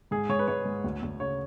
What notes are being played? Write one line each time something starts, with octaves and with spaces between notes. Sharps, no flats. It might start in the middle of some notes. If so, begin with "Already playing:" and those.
G#2 G#4
G#2 C#5
B4
G#3 C#5
G#2
D2
D2
C#3 C#5